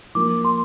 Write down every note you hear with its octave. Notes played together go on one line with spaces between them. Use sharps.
F3 A#3 F4 D6
C6